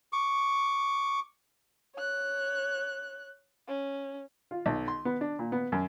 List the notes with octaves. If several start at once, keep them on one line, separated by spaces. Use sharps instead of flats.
C#6 D6
C#5 F#6
C#4
F4
B1
C6
B3
D4
A#2
B3
F#2